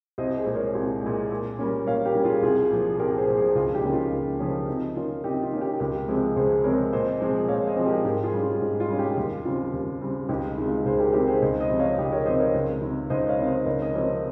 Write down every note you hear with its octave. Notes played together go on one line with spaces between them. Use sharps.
C2 C5 D#5
G#4 C5
A#2 G#3
A#4 C#5
C2
A#2 G#3
A#2
G3 A#3 C#4
A#2 C#5 F5
G4 A#4
G3 A#3 C#4
F4 G#4
C2 F4 G#4
A#2 F3
C2 G4 A#4
G#4 C5
A#2 F3
G#4 C5
C#2 F4 G#4
D#4 G4
C#3 F3 A#3 C#4
F4
C#2
C#3 F3 A#3 C#4
C3 D#4
D#3 A#3 C#4 F4
C3 D#4 G4
F4
D#3 A#3 C#4
D#4 G4
C#2 G4 A#4
C3 F3 G#3
C#2 G#4 C5
C3 F3 G#3 A#4 C#5
A#2 C5 D#5
F3 G#3 C4
A#2 C#5 F5
C5 D#5
F3 G#3 C4
G4 A#4
G#2 G4 A#4
F4 G#4
G3 C#4
F4
G#2
F4
G3 C#4
D#4 G4
D#2 F4
C#3 G3 C4 F4
D#2
C#3 G3 C4
C#2 D#4 G4
C3 D#3 G#3
F4
C#2 G#4 C5
G4 A#4
C3 D#3 G#3 G4 A#4
G#4 C5
C#2 C5 D#5
C5 D#5
C3 F3
C#5 F5
C#2 D#4 G4
A#4 C#5
C3 F3 C5 D#5
A#4 C#5
C#2
C3 D#3
C#2 C5 D#5
C#5 F5
C3 D#3
C5 D#5
C#2 A#4 C#5
D#5
C3 F3 C4 A#4 C#5